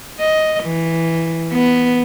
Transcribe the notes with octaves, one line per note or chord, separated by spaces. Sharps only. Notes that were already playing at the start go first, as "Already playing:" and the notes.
D#5
E3
B3